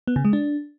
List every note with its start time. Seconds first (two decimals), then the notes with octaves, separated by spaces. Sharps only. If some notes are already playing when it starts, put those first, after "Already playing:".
0.07 B3
0.16 C#3
0.25 G#3
0.33 D4